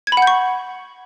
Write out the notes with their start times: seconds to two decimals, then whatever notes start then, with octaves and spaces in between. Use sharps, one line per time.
0.07 G#6
0.12 B5
0.17 F#5
0.22 G6
0.27 C#6